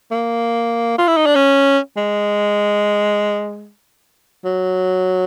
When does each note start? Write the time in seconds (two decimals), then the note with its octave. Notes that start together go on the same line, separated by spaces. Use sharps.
0.11 A#3
0.98 F4
1.07 E4
1.17 D#4
1.26 D4
1.35 C#4
1.97 G#3
4.45 F#3